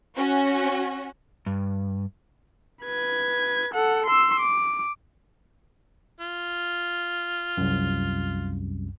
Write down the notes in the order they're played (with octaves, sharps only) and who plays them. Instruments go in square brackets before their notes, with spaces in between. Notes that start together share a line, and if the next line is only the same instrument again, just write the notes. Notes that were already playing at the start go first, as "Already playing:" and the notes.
[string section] C#4 F#4
[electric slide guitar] G2
[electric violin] B4 G#6
A4 F#5
C6 E6
D6
[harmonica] F4
[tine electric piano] C2 F#2